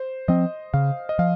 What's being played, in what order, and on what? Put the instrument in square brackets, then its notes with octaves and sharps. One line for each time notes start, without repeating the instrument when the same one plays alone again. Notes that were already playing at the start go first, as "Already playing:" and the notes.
Already playing: [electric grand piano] C5
[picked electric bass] F3 C4 [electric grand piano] D#5
[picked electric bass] C#3 [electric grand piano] F5
[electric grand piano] D#5
[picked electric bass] F3 [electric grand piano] F5